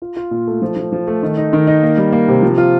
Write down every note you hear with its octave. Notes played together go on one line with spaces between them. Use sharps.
F4
F4
A#2
A3
F3
F3
F3
A3
D#3
D#4
D#3
D#4
A#3
G3
A#3
C3
F3
F4